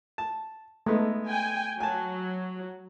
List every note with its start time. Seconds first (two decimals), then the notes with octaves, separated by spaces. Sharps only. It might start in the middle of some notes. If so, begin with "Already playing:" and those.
0.18 A5
0.86 G#3 A3 B3 D#4
1.27 G5 G#5
1.80 F#3 G#5 A5